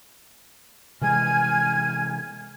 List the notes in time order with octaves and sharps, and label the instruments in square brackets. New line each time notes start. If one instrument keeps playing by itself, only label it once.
[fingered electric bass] C3 E3 G#3 [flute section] G#5 F6 G#6